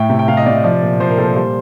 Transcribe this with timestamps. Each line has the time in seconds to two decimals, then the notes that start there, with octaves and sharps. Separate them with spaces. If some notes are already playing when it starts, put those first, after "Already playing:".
Already playing: A2 A3 G5
0.10 C3
0.19 G5
0.28 C3 F5
0.37 D#5
0.46 C3 D5
0.55 D#5
0.64 F3 D5
0.82 A#2
1.00 F3 C5
1.09 A#4
1.18 A#2 A4
1.27 A#4
1.36 G3 C5